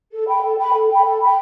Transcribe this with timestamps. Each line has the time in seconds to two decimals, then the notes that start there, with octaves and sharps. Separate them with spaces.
0.12 A4
0.27 G5 B5
0.43 A4
0.58 G5 B5
0.74 A4
0.89 G5 B5
1.04 A4
1.20 G5 B5